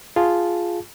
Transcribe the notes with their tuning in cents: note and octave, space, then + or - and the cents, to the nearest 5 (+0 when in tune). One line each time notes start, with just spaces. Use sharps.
F4 +0 G#4 +0 A5 +0